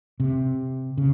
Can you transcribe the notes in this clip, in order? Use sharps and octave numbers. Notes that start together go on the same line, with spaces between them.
C3
C#3